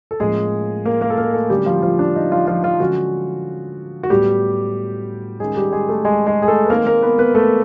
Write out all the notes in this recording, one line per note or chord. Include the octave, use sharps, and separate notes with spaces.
A4
A2 F3 G#3 A#3 C#4 G#4
A#3 A#4
A#3 A#4
A4
A#3 A#4
A3 A4
D3 F#3 G3 A3 C#4 G4
F3 F4
F3 F4
D4
D#4
F3 F4
F3 F4
F3 F4
D3 F3 F#3 G#3 C#4 F#4
F#4
A2 F#3 G3 B3 G4
D#3 G#3 C#4 G#4
G3 G4
G#3 G#4
A3 A4
G#3 G#4
G#3 G#4
G#4
A3 A4
B4
D#3 G#3 A#3 C4 A#4
A#3 A#4
B3 B4
B3 B4
A3 A4